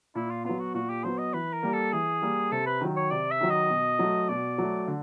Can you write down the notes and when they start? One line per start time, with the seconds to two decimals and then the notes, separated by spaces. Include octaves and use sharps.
0.15 A#2 E4
0.31 F4
0.45 F#3 B3 F4
0.59 F#4
0.74 A#2 F#4
0.90 G4
1.04 F#3 B3 C5
1.18 D#5
1.34 E3 B4
1.53 A#4
1.63 G3 A#3
1.73 A4
1.93 E3 G#4
2.22 G3 A#3
2.52 C3 A4
2.66 B4
2.81 D#3 F#3
2.96 C#5
3.11 C3 D5
3.31 E5
3.41 D#3 F#3
3.50 D#5
3.70 B2
3.99 F#3 A3
4.29 B2 D5
4.58 F#3 A3
4.88 D3